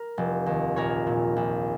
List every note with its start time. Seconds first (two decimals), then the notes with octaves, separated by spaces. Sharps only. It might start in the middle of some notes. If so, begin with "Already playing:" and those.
Already playing: A#4
0.18 F1
0.46 D#2
0.76 A#1 A#4 C#5
1.07 A#2
1.36 A#1